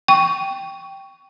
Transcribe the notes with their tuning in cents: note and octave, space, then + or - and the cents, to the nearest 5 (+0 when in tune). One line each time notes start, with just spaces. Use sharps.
G5 +0 C#6 +10